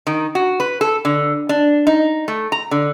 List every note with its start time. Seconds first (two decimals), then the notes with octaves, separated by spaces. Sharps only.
0.07 D#3
0.35 F#4
0.60 B4
0.81 A4
1.05 D3
1.49 D4
1.87 D#4
2.28 A3
2.52 A#5
2.71 D3